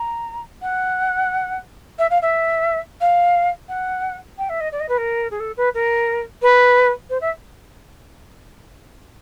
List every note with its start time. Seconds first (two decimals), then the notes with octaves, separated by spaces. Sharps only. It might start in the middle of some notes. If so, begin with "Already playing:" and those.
Already playing: A#5
0.62 F#5
1.99 E5
2.10 F5
2.22 E5
3.01 F5
3.69 F#5
4.38 G5
4.49 E5
4.61 D#5
4.72 D5
4.80 D#5
4.89 B4
4.98 A#4
5.31 G#4
5.40 A4
5.57 B4
5.74 A#4
6.42 B4
7.10 C5
7.21 E5